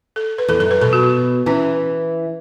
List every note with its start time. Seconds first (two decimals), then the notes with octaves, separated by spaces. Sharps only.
0.16 A4
0.38 B4
0.48 E2 A4
0.60 F#2 A4
0.71 B4
0.81 B2 A4
0.93 F#4
1.03 F#4
1.46 E3 C#4